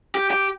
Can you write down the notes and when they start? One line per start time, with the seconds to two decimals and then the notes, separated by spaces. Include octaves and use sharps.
0.15 G4
0.31 G4